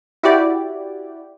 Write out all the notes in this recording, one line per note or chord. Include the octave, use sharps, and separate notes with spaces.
E4 F#4 G4 D5